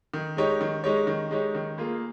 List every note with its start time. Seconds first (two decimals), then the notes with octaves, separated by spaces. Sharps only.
0.14 D#3
0.37 G#3 D#4 G4 C#5
0.61 D#3
0.84 G#3 D#4 G4 C#5
1.07 D#3
1.31 G#3 D#4 G4 C#5
1.55 D#3
1.78 A#3 F4 G#4